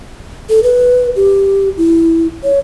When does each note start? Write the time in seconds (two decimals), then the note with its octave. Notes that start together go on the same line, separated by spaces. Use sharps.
0.49 A4
0.63 B4
1.16 G4
1.77 E4
2.44 C#5